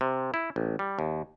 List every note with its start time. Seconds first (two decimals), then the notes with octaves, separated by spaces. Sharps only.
0.01 C3
0.34 E4
0.56 A1
0.79 G3
0.99 D#2